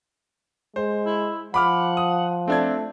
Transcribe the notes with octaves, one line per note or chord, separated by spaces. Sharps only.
G#3 C5
E4
F3 F#5 B5 D6 F6
D#6
A3 C4 D4 G#6